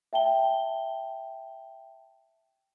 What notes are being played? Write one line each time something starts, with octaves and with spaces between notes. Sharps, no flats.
E5 G5 A5 G7